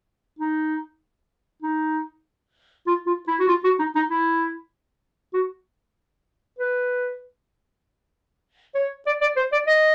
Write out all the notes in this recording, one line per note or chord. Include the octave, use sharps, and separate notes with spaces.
D#4
D#4
F4
F4
E4
F#4
F4
F#4
D#4
D#4
E4
F#4
B4
C#5
D5
D5
C5
D5
D#5